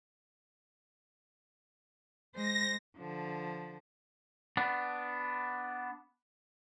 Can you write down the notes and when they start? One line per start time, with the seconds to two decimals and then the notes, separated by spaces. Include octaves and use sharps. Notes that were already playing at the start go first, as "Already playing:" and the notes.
2.35 G#3 C5 A#6
2.97 D3 F3
4.57 B3 D4